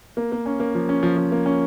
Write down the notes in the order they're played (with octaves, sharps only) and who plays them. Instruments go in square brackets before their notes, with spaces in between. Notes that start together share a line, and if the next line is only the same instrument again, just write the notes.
[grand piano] A#3
A#3
C#4
A#3
F3
C#4
F3
F3
A#3
C#4